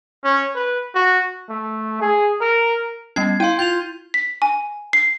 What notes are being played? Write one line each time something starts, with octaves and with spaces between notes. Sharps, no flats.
C#4
B4
F#4
A3
G#4
A#4
G3 B3 C#4 G#6 C7
E4 F5 G5 C6 D#7
F4 G6 F7
B6
G#5
C7